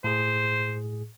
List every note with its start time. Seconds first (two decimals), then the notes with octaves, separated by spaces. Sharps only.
0.04 A2 G#4 C5